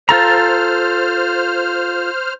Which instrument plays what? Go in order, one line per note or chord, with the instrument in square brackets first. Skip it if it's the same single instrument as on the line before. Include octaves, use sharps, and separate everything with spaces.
[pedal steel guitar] F4 A4 A#5 [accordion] C5 F6